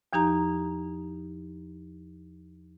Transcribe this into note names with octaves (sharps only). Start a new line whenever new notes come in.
E2 F3 D#4 G4 A#5